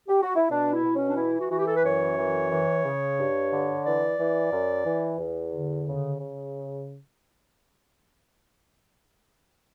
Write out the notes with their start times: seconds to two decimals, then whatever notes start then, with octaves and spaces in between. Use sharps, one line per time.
0.08 G4
0.22 F#4
0.36 E4
0.50 B2 D4
0.73 E4
0.83 B2
0.95 C#4
1.09 D4
1.16 E3 E4
1.40 F#4
1.50 E3 F#4
1.58 G4
1.67 A4
1.76 B4
1.84 F#2 C#5
2.17 E3
2.50 E3
2.84 C#3
3.18 G2
3.51 D3
3.85 E3 D5
4.18 E3
4.51 F#2
4.85 E3
5.18 E2
5.52 D3
5.86 C#3
6.20 C#3